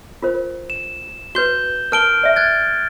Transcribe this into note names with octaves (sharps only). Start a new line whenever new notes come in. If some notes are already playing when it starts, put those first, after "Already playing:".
F4 A#4 C5
E7
F#4 B4 G6 G7
A#4 A5 F6 D7 G7
D5 E5
F#6 G#6 A6